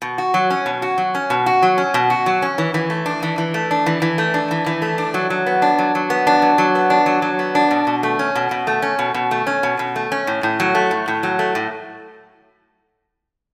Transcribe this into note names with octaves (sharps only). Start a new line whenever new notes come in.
B2
F#4
F#3
C#4
B2
F#4
F#3
C#4
B2
F#4
F#3
C#4
B2
F#4
F#3
C#4
E3
E3
A3
D4
E3
E3
A3
D4
E3
E3
A3
D4
E3
E3
A3
D4
F#3
F#3
B3
D4
F#3
F#3
B3
D4
F#3
F#3
B3
D4
F#3
F#3
B3
D4
B2
B2
A3
C#4
B2
B2
A3
C#4
B2
B2
A3
C#4
B2
B2
A3
C#4
A2
A2
F#3
A3
A2
A2
F#3
A3
A2